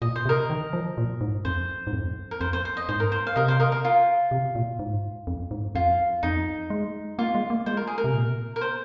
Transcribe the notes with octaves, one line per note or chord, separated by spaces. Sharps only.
A#2 D#5
C5
C3
A#4 D#5
D#3
F3
A#2
G#2
F2 C5
G#2
F2
A#4
F2 C5
C5
C5
D#5
G#2 C5
A#4
C5
F5
C3 A#4 D#5
C5 F5
A#4 D#5
A#4
F4
C3
A#2
G#2
F2
G#2
F2 F4
F2 D#4
G#3
A#3 F4
G#3
A#3
G#3 C5
A#4
G#4
A#4
C3
A#2
A#4
C5